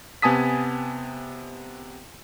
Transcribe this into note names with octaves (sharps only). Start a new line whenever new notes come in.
C3 B3 G#5 A5 D#6 B6